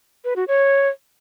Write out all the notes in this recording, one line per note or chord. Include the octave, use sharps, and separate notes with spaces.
B4
F#4
C#5